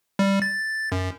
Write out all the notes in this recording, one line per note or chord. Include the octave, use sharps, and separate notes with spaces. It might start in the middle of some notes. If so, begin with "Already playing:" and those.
G3
A6
F#2